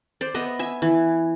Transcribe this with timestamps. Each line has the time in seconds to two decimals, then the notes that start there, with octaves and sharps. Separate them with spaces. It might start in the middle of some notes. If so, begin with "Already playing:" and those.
0.21 C5 D5
0.34 B3 D#5 E5
0.59 E5 G#5
0.82 E3